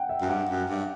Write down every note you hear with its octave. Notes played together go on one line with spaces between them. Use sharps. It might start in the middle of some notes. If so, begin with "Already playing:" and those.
Already playing: F#5 G5
E5
F#2
G2 F#5
F#2
G2